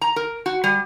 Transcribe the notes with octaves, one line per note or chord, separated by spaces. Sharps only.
A#5
A#4
F#4
G3